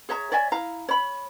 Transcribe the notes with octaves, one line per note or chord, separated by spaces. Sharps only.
G#4 C#5 E5 A#5
C#5 D5 E5 G#5
E4 F5 A#5
C#5 B5